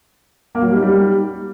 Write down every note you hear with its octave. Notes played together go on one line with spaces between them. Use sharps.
A#3
F#3
G3
D#4
G3